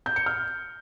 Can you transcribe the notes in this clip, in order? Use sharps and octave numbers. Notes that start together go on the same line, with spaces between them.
G6
C#7
F6